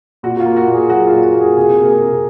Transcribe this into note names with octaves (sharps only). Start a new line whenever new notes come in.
A#2 F#4
F#4
F4
A#3
F#4
A#2
G#4
F#3 F#4
F4
A#2
F#4
A#3
G#4
C3 G#4
A#3 A#4
G#4
C3